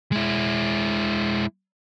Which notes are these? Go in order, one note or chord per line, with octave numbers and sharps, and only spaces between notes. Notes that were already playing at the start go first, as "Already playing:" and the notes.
G#3 E4